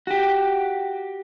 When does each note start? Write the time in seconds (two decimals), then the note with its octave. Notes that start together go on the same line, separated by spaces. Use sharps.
0.07 F#4 G4